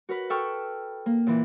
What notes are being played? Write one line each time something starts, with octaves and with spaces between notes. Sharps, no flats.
F#4 A#4 B4
A4 G5 C#6 E6 F6
A#3
A#2 E3